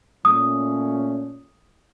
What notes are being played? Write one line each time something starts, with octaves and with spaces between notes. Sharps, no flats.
A#2 A3 C#4 D#6